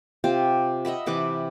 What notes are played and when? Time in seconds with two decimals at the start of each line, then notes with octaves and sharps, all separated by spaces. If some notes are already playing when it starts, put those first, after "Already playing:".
0.24 C3 C4 F4 G4
0.85 D#5 E5 F#5 B5
1.06 C3 E3 B4 D6